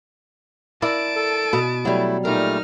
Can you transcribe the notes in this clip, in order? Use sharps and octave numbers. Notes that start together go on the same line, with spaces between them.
E4 A#4 D5 A5 D7
A4
B2 B4
F#3 G3 A3 E4
A#2 G3 A3 D#4 A#4 F6